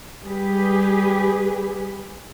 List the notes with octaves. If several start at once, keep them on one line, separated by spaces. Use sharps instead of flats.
G3 G4 G#4 B4